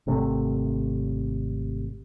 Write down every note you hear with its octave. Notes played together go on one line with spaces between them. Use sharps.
G#1 C3 A3